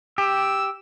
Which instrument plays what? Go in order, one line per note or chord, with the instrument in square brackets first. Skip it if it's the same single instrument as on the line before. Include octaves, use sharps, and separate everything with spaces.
[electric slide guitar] G4 [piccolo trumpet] E6